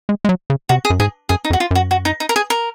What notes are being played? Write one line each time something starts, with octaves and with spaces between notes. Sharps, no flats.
G#3
G#3
F#3
C#3
C3 F#4
G#4
F#2
G#2 G#4
F#2 G#4
D#4
F2
F#4
F4
F#2 F#4
F#4
D#4
D#4
A#4
G#4
A#4